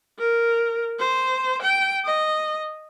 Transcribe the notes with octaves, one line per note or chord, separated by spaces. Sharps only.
A#4
C5
G5
D#5